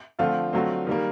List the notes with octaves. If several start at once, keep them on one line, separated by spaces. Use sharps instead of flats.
D3 F3 A3 C4 F4
D3 F#3 A3 C4
D#3 G3 A#3